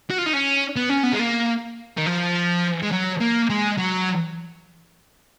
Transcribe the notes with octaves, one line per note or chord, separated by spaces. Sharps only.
F#4
F4
D#4
C#4
B3
C#4
B3
G#3
A#3
D#3
F3
G#3
F#3
A#3
G#3
F#3